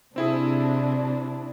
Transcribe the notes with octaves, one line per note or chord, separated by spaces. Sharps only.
C3 C4 D4 E4 G#4